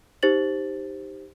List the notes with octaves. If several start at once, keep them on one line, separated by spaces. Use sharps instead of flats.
D#4 G4 C5 A6 F#7